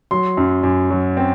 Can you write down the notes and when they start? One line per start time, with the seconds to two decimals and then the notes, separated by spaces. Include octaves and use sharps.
0.11 F#3 C6
0.37 F#2
0.63 F#2
0.91 F#3
1.17 C4